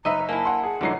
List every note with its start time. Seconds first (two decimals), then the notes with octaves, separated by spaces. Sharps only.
0.05 F#1 D#4 B4 D#5 E5 A#5
0.29 A#3 D4 E4 A4 G#5
0.45 F#5 C6
0.63 G#4 F#5
0.81 F1 D3 E3 F#3 D#4 D5 C7